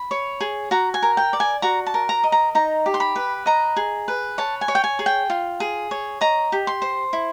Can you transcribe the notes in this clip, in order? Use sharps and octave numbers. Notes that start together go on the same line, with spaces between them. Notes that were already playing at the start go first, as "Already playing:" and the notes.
Already playing: B5
C#5
G#4
F#4 A#5
G#5
A#4
G5
D5
G#5
F#4 A#5
A5
A#4
A#5
D#5
A#5
D#4 A#5
G4
C6
B5
B4
D#5 A#5
G#4
B4
C#5 A5
G#5
C#5
G5
G#5
G#4
G5
F4
G#4
C#5
D#5 A#5
G4
C6
C5
E4